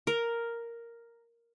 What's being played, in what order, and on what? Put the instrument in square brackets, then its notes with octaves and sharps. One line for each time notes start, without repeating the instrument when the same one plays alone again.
[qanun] A#4